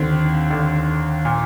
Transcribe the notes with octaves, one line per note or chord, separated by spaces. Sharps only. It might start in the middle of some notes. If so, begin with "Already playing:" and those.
Already playing: D#2 D3 C4
D#2 D3
A#2